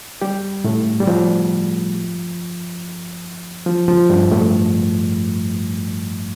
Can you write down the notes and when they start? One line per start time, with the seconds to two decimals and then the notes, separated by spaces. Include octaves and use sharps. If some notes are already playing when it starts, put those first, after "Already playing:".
0.21 G3 G4
0.64 A2 A3
1.00 G3
1.07 F3
3.66 F3
3.88 F3
4.10 G2 G3
4.31 A2 A3